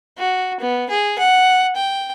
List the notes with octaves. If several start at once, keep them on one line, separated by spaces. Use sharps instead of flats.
F#4
B3
G#4
F#5
G5